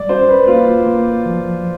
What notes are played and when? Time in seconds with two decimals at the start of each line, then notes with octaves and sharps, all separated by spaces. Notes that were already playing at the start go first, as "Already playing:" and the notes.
Already playing: G3 D5
0.09 C#4 C5
0.29 B4
0.47 A#3 F4
0.86 A#3
1.26 F3